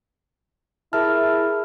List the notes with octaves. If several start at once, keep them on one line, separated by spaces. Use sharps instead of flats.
E4 G#4 A#4 E5 A5 F6